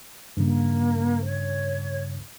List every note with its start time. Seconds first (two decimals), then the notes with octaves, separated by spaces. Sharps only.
0.37 G2 C#3 A#3
1.25 C#5